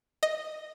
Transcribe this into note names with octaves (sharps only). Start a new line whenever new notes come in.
D#5